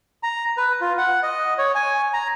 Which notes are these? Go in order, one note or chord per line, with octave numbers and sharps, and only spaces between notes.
A#5
B4
F4
F#5
D#5
C#5
G#5
A#5